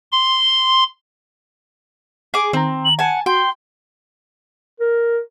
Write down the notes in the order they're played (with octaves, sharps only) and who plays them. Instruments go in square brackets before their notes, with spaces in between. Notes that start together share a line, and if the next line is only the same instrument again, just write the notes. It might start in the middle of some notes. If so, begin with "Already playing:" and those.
[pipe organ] C6
[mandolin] G#4 D6
[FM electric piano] D#3 A#5 [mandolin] C4
[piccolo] F#7
[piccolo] F#5 [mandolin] G#5 A5
[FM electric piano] F#4 [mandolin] G5 [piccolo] C6
[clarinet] A#4